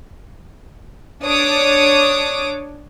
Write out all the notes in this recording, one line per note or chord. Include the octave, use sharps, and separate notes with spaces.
D4 C#5 D6 D#6